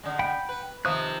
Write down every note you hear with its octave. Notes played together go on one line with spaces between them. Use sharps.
D3 G#3
F#5 G5 B5
B4
C3 D#3 F3 D#6 F#6